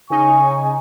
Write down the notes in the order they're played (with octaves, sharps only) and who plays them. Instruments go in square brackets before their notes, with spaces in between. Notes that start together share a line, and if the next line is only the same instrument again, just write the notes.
[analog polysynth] C#3 D#4 [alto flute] G#5 [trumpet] C#6